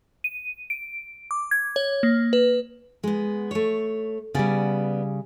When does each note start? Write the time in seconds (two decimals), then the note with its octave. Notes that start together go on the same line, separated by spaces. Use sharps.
0.24 D#7
0.70 D7
1.31 D6
1.51 G#6
1.76 C#5
2.03 A#3
2.33 B4
3.04 G#3 B3
3.51 A3 C#5
4.35 C#3 G3 B3 D5 G#5